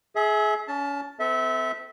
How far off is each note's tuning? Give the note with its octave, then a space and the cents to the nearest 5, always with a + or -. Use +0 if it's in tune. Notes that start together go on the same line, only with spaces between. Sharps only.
G#4 +25 E5 -25
C#4 +35 A5 +0
C4 -40 A4 +0 E5 -20